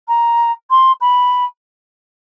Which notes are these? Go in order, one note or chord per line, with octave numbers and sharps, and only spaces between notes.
A#5
C6
B5